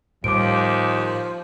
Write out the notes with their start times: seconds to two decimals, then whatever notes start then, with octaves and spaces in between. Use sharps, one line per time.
0.24 D#2 A2 F3 G3 D6 D7